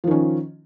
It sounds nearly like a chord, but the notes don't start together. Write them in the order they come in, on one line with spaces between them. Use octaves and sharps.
F3 D#3 C#4